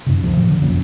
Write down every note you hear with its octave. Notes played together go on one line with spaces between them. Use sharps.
F#2 C3
D2 F3
A2 D#3 F3
D3
F#1 B1 F2 C#4